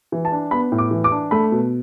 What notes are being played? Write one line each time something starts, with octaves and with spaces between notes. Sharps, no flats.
E3
A5
D4
B3 B5
A2
D6
E3
D6
D4
A3 B5
B2